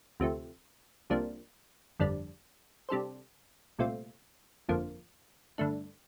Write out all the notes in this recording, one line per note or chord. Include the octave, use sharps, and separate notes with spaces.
D2 C3 F3 A3
C2 C3 F3 A#3 D4
G1 F2 D3 G3 D4
C3 G3 D4 A4 C5
C2 A#2 A3 C4 F4
G1 F2 D3 F3 A#3
G2 D3 A3 D4